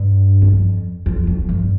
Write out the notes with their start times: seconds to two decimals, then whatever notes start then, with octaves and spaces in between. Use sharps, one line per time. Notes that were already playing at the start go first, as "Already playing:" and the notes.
Already playing: G2
0.42 F2
1.06 F2
1.27 F2
1.49 G2